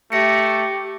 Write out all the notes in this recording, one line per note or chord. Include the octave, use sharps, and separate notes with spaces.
A3 G4 E5 A#6 C#7